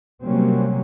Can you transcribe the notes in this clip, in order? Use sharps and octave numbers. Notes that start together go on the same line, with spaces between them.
C3 F#3 G3 A#3 C4 C#4